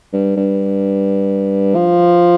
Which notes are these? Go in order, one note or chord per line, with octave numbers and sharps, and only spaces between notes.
G2
G2
F3